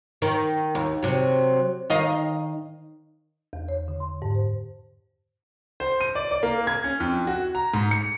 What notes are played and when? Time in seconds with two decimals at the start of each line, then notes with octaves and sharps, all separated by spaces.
0.22 D#3
0.75 D#2
1.03 C3 F#3
1.90 D#3 D#5 F5
3.53 E2
3.69 C#5
3.88 D3
4.00 C6
4.22 G#2
4.35 C5
5.80 C5
6.01 D#7
6.15 D5
6.31 D5
6.43 A#3
6.67 G#6
6.84 C#4
7.00 F2
7.27 F#4
7.55 A#5
7.74 G#2
7.91 C#7